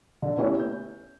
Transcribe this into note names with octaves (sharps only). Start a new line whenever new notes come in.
D3
A3 B3 C#4 E4 G4 C#5
G6